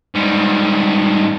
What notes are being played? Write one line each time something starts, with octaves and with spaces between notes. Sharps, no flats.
G#2 G3